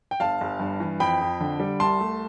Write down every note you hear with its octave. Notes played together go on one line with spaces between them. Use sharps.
G5
G1 F5 A5
G1
G2
E3
F2 G5 B5
F2
D3
G3
C2 A5 C6
A3